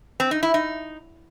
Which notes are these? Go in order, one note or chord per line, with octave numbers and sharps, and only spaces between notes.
C4
D#4
E4
D#4